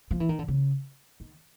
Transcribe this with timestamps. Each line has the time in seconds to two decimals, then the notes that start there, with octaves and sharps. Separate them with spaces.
0.11 F3
0.20 E3
0.29 D#3
0.39 D3
0.48 C#3
1.20 D#3